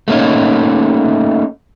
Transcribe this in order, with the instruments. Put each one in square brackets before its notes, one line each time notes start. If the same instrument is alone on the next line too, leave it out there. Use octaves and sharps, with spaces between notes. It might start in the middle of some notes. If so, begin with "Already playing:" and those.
[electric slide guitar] A3 A#3 C#4 D#4